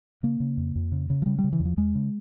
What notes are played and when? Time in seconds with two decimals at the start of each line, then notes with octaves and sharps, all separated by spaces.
0.23 C#3 A#3
0.40 C#3
0.57 F2
0.76 F2
0.92 C#3
1.10 C#3
1.22 F3
1.26 C#3 G3
1.38 G3
1.44 C#3
1.53 E3
1.60 E2
1.65 F3
1.77 E2 G#3
1.95 C#3